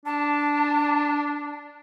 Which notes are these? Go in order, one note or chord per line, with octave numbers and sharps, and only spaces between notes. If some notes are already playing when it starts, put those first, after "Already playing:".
D4 A5